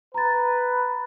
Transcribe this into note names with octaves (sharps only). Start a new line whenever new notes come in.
B4 A#5 A6